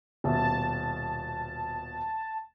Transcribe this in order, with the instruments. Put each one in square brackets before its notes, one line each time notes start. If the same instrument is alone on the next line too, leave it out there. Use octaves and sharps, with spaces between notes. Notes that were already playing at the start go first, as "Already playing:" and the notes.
[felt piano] D#1 B2 E5 [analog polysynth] A5